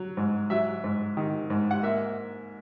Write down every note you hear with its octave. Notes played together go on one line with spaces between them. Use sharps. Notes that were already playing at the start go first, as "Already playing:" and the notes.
Already playing: F#3
G#2
F#3 E5
G#2
D#3
G#2
F#5
A#3 E5